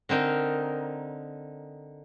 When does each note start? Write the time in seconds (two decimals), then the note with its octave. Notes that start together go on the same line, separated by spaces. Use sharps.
0.09 D3 C4 D#4 A#4